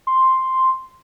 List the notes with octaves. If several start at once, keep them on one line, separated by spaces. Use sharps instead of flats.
C6